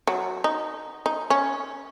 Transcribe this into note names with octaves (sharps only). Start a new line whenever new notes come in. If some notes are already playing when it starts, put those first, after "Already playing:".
F#3
D#4
D#4
C#4